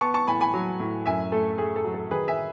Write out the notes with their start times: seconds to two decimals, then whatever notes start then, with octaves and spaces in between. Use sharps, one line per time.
0.01 B3 A5 C#6
0.14 A5 C#6
0.27 A2 G#5 B5
0.41 G#5 B5
0.54 F#3
0.80 A2
1.06 F#2 E5 G#5
1.32 A3 A4
1.58 A3 G#4
1.76 A4
1.84 F#3
1.94 A4
2.11 D#3 G#4 B4
2.28 E5 G#5